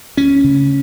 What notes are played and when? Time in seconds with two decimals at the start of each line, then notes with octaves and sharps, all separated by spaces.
0.17 D2 C#4
0.44 C#3